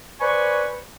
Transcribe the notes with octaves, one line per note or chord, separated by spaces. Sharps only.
B4 C5 D5 G#5 B5 C#6